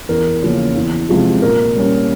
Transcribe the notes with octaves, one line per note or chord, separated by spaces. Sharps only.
E2 A#4
C#3 F3 A#3 C#4
E2
C3 F3 G#3
A#2 A#4
G3 A#3 C#4